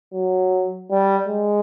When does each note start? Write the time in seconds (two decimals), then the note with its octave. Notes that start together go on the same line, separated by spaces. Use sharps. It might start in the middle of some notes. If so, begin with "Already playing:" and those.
0.13 F#3
0.91 G3
1.28 G#3